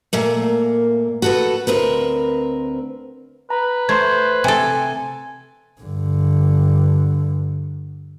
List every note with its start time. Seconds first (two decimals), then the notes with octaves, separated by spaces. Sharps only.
0.13 A#2 A3 A#3
1.22 F#4 A4 B4
1.67 D2 C4 A#4 B4
3.50 B4 A#5
3.89 A3 C5 C6 G#6
4.44 C3 A4 G#5
5.82 G2 D3